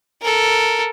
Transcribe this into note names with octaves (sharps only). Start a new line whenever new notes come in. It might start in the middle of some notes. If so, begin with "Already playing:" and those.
A4 A#4